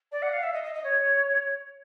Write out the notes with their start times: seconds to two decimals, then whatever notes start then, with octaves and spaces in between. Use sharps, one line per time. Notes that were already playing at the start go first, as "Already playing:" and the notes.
0.11 D5
0.22 F#5
0.32 F5
0.42 E5
0.53 D#5
0.63 D#5
0.74 D#5
0.83 C#5